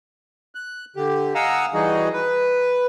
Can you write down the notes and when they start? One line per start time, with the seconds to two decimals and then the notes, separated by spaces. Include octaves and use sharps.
0.55 F#6
0.96 D3 G4
1.35 D#5 F5 F#5 G#5 A#5 E6
1.74 E3 G3 D#4 F#4 G#4 D#5
2.13 B4